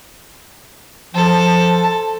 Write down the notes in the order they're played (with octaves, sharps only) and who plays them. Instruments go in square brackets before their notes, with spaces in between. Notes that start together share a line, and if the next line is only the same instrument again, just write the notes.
[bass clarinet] F3 [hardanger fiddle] A4